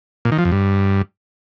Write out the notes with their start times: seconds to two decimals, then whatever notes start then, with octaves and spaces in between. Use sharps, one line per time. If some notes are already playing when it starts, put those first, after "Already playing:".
0.25 A#2
0.32 D#3
0.38 F3
0.45 F2
0.52 G2